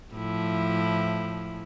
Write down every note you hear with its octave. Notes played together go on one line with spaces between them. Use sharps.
A2 F3 E4